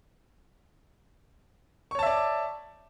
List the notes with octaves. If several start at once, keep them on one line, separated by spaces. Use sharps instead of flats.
C#5 D5 E5 A5 C#6